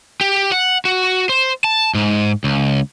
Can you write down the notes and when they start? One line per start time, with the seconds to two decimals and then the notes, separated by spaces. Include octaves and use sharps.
0.21 G4
0.52 F#5
0.85 F#4
1.29 C5
1.64 A5
1.95 G#2
2.44 C#2